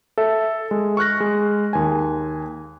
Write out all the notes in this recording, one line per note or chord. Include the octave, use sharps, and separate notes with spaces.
A4 E5
G#3
C#6 F6 F#6 A#6
G#3
D#2 G#5